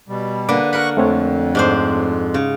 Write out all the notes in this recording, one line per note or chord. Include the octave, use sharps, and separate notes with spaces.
B2 G3
D3 A#3 B4 D6
A#4 F#5 B5 C#6 F#6
F2 A3 C4 C#5
G#2 D4 C5
C#3